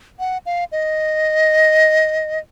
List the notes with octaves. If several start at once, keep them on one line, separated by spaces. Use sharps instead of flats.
F#5
F5
D#5